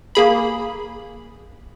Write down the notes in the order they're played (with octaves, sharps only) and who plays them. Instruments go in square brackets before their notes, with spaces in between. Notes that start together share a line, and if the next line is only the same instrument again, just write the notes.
[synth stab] A#3 G#4 B5